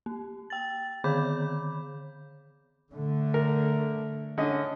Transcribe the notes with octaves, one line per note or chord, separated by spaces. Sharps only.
A#3
G5 A6
D3 D#3 G#4 B5 D6 G6
D3 A3
A#4
D3 C#4 D#5